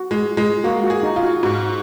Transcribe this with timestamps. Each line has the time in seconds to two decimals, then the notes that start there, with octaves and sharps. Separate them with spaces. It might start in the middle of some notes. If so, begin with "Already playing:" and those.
Already playing: F#4
0.11 G#3
0.37 G#3
0.64 A#3 F#4
0.84 F#4
0.90 G#4
1.03 D#4
1.16 F4
1.23 F#4
1.43 G#2 F#4